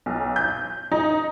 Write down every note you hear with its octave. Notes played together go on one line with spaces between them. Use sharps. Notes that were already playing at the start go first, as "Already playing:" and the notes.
B1
G6
D#4